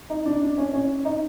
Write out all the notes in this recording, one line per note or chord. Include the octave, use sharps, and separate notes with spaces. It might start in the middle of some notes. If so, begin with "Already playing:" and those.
D#4
D4
D4
C#4
C#4
D#4